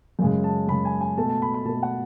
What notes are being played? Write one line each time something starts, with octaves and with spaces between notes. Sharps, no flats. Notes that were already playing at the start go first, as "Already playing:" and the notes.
F#2 C#3 G#3
A5
F#2 C#3 G#3 B5
G#5
G#5
B2 A3 A5
A5
B5
B5
B2 A3 A5
F#5